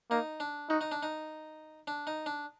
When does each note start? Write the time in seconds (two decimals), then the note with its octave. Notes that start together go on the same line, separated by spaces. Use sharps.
0.11 A#3 D#4
0.40 D4
0.69 D#4 F#4
0.81 D#4
0.92 D4
1.03 D#4
1.87 D4
2.07 D#4
2.26 D4